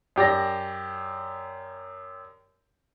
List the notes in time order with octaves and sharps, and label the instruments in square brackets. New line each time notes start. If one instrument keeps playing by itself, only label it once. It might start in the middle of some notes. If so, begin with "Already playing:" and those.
[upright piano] F#2 G4 D5 A#6